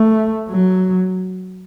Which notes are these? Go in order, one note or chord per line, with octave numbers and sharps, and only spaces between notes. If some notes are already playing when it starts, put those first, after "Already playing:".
Already playing: A3
F#3